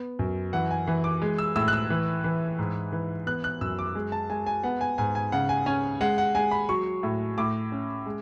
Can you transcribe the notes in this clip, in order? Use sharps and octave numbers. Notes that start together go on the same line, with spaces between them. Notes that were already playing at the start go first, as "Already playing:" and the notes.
Already playing: B3
F#2
E3 F#5
G#5
E3
D6
G#3
E6
A2 E6
F#6
E6
E3
E3
G#2
E3
B3 F#6
F#6
F#2 E6
D6
G#3
A5
G#3 G#5
G#5
B3 F#5
G#5
G#2 G#5
G#5
C#3 F#5
G#5
C#4 G#5
G#3 F#5
F#5
G#3 G#5
B5
F#3 C#6
A2
A2 D6
C#4
G#3